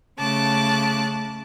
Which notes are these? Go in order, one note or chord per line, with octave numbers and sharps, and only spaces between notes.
C#3 A3 A5 D6 F#6